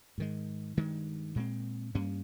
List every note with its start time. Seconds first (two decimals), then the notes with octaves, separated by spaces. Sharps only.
0.18 G#2 D#3 G#3
0.77 G2 D#3 G#3
1.35 A#2 G#3 C4
1.95 G2 G3 A#3 C#4